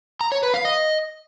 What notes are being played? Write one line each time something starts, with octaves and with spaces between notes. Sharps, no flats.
A#5
C#5
B4
F5
D#5